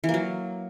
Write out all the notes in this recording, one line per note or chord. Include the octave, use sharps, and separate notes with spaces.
E3
A#3
F#3